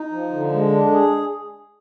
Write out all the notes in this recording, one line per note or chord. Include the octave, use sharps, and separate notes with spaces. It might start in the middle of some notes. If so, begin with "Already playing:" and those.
Already playing: D#4
F3
D3
G#3
D4
G#4